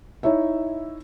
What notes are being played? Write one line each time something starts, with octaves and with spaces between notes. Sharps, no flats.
D#4 E4 C#5 E5